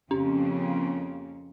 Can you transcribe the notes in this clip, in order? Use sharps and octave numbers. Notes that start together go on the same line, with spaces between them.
F2 C#3 A#3 C#4